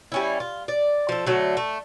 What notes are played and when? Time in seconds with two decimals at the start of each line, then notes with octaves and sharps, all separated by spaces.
0.12 G3 C#4 E4
0.40 F4
0.68 D5
1.09 F3 A3
1.26 D3 F#3 A3
1.57 A3